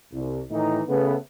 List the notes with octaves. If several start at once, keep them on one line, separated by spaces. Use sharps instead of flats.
C2
A2 D#3 E3 D#4
C#3 A3 B3